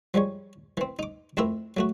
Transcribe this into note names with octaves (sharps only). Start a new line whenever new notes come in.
F3 G3 G#3 C#5
E3 C4
D#4 D6
F2 A3 C4 E4 A#4 E5
F#3 A3 F#4